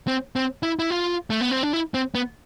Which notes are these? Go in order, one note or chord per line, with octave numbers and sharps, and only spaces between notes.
C4
C4
E4
E4
F4
A3
B3
C4
D4
E4
C4
B3